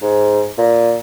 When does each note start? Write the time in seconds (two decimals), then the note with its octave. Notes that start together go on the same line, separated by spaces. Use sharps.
0.02 G#2
0.58 A#2